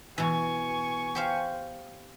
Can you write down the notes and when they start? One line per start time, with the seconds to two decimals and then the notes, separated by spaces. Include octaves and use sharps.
0.18 B2 E3 G#5 C#6
1.15 G4 C5 F5